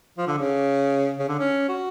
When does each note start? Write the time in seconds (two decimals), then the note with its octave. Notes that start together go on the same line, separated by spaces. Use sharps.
0.18 F3
0.28 D3
0.38 C#3
1.19 C#3
1.28 D3
1.39 C#4
1.69 F#4